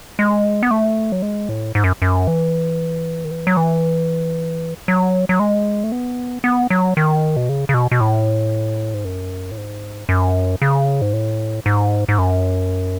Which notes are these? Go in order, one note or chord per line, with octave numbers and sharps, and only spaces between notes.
G#3
B3
A3
F#3
G#3
A2
G#2
F#2
F#2
E3
D#3
E3
F#3
E3
F#3
F#3
G#3
A3
B3
B3
F#3
D#3
B2
C#3
C#3
B2
B2
A2
G#2
F#2
A2
G#2
F#2
C#3
G#2
A2
G#2
G#2
F#2